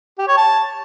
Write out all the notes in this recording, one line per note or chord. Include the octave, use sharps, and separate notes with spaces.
G4
C#5
A5